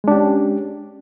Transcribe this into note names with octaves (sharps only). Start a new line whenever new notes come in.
G#3 C#4 D4 G4